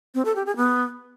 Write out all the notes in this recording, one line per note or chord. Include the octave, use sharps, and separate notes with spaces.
C4
A4
G4
G#4
B3